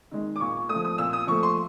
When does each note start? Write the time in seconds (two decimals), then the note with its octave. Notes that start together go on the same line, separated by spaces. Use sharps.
0.11 D#3 G#3
0.36 D6
0.40 A#2 C#6
0.69 A3 D#6
0.75 F3
0.85 D#6
0.98 A#2 E6
1.13 D#6
1.27 F3 A3 C#6
1.43 C6